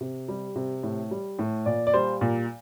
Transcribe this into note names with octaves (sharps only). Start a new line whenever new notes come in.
C3
G3
C3
A2
G3
A2
A#2 D5
D5
G3 C5
A#2